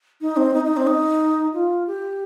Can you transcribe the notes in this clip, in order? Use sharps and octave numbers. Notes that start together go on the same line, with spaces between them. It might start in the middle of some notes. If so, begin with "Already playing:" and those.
D#4
C4
D#4
D#4
C4
D#4
F4
G4